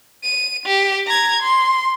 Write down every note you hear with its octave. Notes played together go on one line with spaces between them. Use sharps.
D#7
G4
A#5 G#6
C6